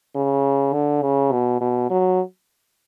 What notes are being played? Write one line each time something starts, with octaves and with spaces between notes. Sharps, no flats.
C#3
D3
C#3
B2
B2
F#3